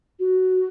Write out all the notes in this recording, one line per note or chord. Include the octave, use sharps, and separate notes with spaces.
F#4